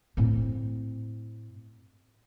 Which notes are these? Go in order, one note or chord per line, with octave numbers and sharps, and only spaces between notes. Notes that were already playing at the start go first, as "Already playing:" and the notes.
A2 C4